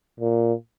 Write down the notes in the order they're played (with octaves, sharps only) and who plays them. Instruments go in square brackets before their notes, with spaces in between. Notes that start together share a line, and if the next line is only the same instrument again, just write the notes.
[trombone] A#2